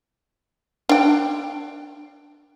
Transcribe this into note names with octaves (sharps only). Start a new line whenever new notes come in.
D4 G5